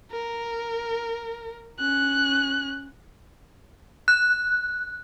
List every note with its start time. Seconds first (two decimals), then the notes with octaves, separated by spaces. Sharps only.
0.12 A#4
1.79 C#4 F#6
4.08 F#6